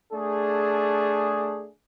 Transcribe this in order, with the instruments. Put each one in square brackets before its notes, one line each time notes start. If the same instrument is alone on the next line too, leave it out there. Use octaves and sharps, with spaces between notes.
[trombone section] A3 D4 G#4